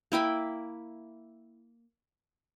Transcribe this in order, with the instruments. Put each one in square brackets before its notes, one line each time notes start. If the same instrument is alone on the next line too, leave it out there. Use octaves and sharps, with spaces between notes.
[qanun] A#3 E4 G5 B5